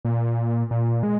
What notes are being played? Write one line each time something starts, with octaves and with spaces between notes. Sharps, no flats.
A#2
A#2
G#3